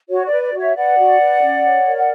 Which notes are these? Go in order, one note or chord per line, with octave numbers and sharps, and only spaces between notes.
F#4 C#5
D5
B4
D5
F#4 C#5 E5
B4 D5 F#5
F#4
B4
C#4
C#5
A#4
F#5